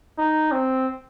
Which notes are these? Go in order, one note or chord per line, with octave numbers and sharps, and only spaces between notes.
D#4
C4